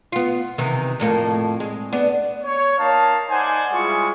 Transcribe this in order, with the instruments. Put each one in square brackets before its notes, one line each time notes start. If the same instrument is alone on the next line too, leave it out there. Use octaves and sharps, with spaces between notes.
[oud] B3 F4
C3 D#3 E3
F2 A2 A#3
G#3
B3 D4
[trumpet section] C#5
A#3 D#4 F5 A5
D#4 C5 D5 F#5 G#5
G3 G#3 E4 F4 G#4 C#6